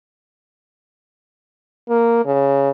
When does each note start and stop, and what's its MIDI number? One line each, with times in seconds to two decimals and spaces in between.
1.89 2.23 58
2.25 2.69 49